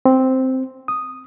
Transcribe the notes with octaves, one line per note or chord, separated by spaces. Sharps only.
C4
D#6